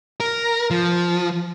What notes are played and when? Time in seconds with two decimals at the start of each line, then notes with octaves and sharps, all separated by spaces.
0.20 A#4
0.71 F3